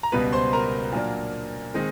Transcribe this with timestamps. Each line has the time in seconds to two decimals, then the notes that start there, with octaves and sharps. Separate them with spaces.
0.03 A#5
0.12 C#2 B2 G3 B3 B4 B5
0.33 C5 C6
0.53 A#4 A#5
0.92 A#2 F#3 A#3 D4
1.74 D#3 G#3 C4 D#4